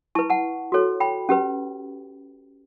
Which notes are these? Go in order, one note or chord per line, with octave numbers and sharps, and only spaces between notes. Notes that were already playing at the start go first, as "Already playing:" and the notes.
E4 B4 A5 C#6
F#5 A5
F#4 A4 C#5
G5 B5
C#4 G4 B4